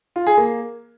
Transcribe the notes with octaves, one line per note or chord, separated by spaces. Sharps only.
F4
G#4
A#3